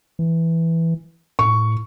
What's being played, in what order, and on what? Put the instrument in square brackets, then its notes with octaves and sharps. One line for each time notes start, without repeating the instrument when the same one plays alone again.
[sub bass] E3
[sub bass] A2 [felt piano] C#6